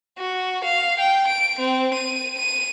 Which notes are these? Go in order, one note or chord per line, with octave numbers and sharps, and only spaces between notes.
F#4
F5
G5
D7
C4
D#7
D#7